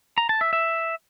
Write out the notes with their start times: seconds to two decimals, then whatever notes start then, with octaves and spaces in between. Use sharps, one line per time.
0.18 A#5
0.29 A5
0.41 E5
0.53 E5